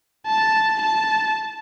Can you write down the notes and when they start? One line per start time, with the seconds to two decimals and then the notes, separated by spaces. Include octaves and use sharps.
0.27 A5
0.81 A5